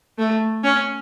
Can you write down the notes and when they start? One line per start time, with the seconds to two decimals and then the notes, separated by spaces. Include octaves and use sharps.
0.18 A3
0.64 C#4